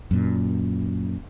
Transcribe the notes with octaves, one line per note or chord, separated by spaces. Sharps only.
F#2 A#2